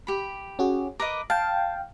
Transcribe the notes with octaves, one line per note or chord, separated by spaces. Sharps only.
G4 B5
C#4 F#4 G#4
A#4 B4 D#5 D6
F5 G5 A5